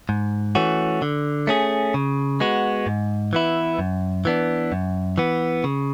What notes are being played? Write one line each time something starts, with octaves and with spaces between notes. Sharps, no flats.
G#2
E3 A3 C#4 F#4
D3
A3 C#4 G#4
C#3
G#3 B3 F#4
G#2
E3 B3 E4
F#2
E3 B3 D4
F#2
E3 B3
C#3